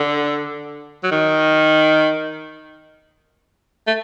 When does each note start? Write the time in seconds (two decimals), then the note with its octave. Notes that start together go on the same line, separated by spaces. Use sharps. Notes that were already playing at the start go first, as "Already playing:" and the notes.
Already playing: D3
1.04 F#3
1.11 D#3
3.87 A3